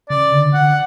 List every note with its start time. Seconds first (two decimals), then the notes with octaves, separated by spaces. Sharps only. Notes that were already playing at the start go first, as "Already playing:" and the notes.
0.10 C#3 D5
0.32 D3
0.54 D3 F#5